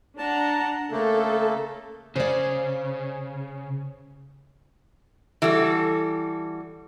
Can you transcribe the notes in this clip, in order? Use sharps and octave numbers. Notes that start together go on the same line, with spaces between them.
D4 F#5 A5 A#5
C#3 A3 A#3 A4
C#3 C5 D5
E3 G3 F#4 A4